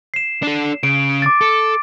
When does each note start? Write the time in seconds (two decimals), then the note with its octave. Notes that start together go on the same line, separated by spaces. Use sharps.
0.14 C7 E7
0.43 D4 A4
0.83 C#3 D7
1.22 D6 A6
1.41 A4 A6